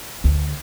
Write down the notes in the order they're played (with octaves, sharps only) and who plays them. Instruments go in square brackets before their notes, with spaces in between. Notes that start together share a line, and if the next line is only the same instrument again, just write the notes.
[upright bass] D2